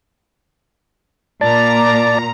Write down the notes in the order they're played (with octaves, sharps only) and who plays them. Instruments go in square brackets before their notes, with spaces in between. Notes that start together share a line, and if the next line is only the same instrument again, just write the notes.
[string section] A#2 A#5 [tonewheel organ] D5 A5